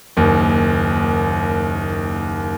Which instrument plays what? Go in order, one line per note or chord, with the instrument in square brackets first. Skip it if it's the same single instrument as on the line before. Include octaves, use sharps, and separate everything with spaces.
[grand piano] F#1 D#2